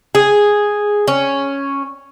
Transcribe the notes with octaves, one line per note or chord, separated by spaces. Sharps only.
G#4
C#4